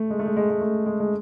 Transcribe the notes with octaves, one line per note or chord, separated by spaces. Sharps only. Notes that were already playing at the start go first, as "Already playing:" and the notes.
Already playing: A3
G#3
A3
G#3
G#3
G#3
A3
G#3
G#3